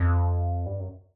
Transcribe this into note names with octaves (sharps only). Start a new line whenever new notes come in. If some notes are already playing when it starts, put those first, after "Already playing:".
Already playing: F2
G2
F#2